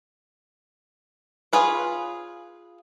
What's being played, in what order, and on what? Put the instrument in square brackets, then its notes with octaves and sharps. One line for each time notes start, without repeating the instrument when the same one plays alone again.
[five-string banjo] F4 G#4 B4 C#5